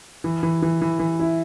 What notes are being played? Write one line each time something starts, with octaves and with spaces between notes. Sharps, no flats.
E3
E3
E3
E3
E3
E4